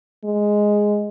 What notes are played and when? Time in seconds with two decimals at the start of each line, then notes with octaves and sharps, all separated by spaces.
0.25 G#3